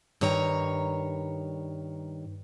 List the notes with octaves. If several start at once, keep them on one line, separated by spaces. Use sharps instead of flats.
G2 D#3 C#5 A#5